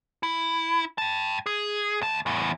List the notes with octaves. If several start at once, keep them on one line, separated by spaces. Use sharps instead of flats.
E4
G5 A5
G#4
D2 A5
E2 A2